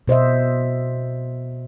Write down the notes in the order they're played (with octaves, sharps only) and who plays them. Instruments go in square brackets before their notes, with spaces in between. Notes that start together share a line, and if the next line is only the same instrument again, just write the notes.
[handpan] B2 C5 D#5 E5